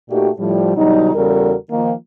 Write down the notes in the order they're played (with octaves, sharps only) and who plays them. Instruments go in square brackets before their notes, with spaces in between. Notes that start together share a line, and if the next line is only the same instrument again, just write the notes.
[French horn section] A#2 A3 D#4 F#4 G4
A2 F3 G3
B2 D3 F#3 G3 D#4
E2 C#3 G3 F#4 A4 A#4
D#3 F3 A#3